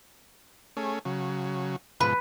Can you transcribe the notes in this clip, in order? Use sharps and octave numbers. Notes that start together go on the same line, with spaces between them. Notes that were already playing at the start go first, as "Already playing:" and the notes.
A3 C#4 G#4
C#3 F#3
G#2 B2 F3 B4